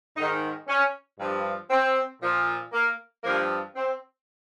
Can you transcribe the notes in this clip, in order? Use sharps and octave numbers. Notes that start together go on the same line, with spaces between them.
G#2 D#3 D#4
C#4
G2 F3
C4
A#2 F3
A#3
G2 F3 A#3
C4